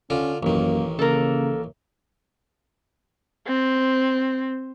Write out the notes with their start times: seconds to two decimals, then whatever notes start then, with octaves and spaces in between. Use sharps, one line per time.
0.10 D3 C#4 F4
0.43 A1 F#2 D#3 A#3
0.99 C#3 A#3 A4 A#4
3.47 C4